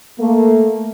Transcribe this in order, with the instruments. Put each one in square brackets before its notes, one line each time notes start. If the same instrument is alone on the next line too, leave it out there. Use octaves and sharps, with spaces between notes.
[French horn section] A3 A#3